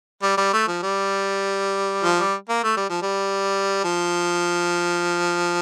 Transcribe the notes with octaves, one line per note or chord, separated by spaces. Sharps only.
G3
G3
A3
F3
G3
F3
G3
A#3
A3
G3
F3
G3
F3